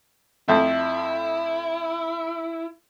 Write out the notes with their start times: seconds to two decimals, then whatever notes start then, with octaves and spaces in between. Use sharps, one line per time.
0.48 F2 A3 E4